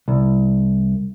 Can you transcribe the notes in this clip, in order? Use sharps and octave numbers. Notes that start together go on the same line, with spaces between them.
C2